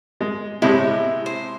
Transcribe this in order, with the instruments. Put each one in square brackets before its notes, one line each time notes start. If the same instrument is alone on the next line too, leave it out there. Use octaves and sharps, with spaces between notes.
[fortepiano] G#3
[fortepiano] A2 C3 G#3 [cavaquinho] E4
[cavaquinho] C5